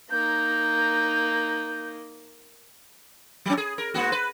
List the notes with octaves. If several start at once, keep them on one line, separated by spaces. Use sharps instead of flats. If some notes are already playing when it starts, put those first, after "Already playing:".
A#3 D#4 G6
F#3 C#4
G#4
A#4
G#2 A#3 F#4
B4